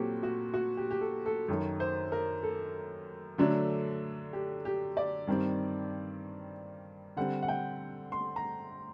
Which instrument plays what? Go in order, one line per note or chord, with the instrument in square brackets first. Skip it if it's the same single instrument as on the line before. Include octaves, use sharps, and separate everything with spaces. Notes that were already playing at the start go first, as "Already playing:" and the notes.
Already playing: [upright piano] A#2 F#3 C4 F#4 G4 A4
F#4
F#4
G4
G4
A4
A4
F#2 D#3 F#3 A4
C5
A#4
A4
D3 F#3 A3 D4
G4
G4
D5
G2 D#3 G3 C4
D3 G3 C4 F#5
F#5
G5
C6
A#5